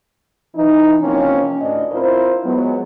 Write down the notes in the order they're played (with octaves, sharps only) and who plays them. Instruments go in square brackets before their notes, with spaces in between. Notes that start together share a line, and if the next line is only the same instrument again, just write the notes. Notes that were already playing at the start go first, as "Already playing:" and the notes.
[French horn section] E3 D#4
C3 F3 A#3 C4 C#4
D2 A2 D3 D4 D5 D#5
C4 E4 F4 A#4 C5
F#3 G#3 B3